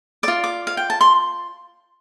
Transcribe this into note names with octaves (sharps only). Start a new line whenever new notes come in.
F4 D5 D6
D6
F5
G5
A5
C6